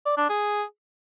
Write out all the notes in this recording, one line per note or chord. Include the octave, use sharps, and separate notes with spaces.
D5
D4
G#4